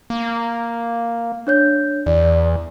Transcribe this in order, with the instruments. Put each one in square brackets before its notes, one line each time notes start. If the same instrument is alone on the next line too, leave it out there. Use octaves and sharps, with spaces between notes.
[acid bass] A#3
[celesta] D4 C#5 G6
[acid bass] E2 [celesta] D5